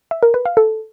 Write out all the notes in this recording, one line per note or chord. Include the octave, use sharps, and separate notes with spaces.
E5
A#4
B4
F5
A4